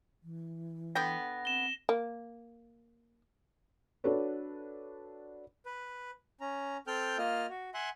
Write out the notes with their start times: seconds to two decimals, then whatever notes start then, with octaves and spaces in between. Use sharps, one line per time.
0.23 E3
0.95 D3 B3 G5 A#6
1.45 C4 E7 G7
1.89 A#3
4.04 D4 F#4 A4 B4 C#5
5.66 B4
6.41 C#4 A#5
6.87 C4 A4 G5 F6 G6
7.18 A#3 F4 D#5 F6
7.49 F#4
7.74 E5 F#5 G#5 C6 F#6